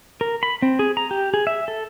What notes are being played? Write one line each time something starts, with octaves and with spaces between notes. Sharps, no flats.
A#4
B5
C4
G#4
A#5
G4
G#4
E5
A4